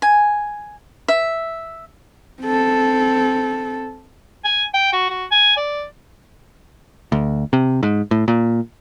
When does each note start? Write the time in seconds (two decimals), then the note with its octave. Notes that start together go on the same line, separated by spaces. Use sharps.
0.02 G#5
1.08 E5
2.42 C4 A4
4.45 G#5
4.74 G5
4.93 F#4
5.10 F#4
5.31 G#5
5.57 D5
7.12 D2
7.53 C3
7.83 G#2
8.11 A2
8.28 A#2